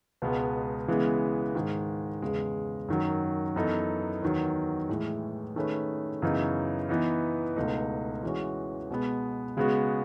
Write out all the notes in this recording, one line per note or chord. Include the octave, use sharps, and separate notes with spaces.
C#2 B2 G#3 B3
C#3 E3 G#3 B3
G#2 D#3 G#3
E2 C#3 G#3
F#2 D#3 F#3
F#2 E3 B3 D#4 A4
E2 D#3 F#3
A2 E3 G#3
D#3 A3 C#4 G#4 B4
F#2 C#3 E3 B3 D#4
E3 B3 D#4
C#2 B2 A3 D#4
E3 G#3 C#4 F#4
B2 G#3 B3
C#3 G#3 B3 F#4